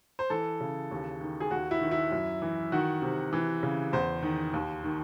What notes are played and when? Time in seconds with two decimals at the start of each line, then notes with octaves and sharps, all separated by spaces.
0.19 C5
0.30 E3 A4
0.60 C#3
0.91 D#2
1.21 D#3
1.40 G#4
1.51 D#2 F#4
1.71 E4
1.81 D#3
1.91 E4
2.12 F#2
2.42 E3
2.72 D#3 F#4
3.02 C3
3.33 E3
3.63 C#3
3.93 E2 C5
4.23 D#3
4.53 D#2
4.84 D#3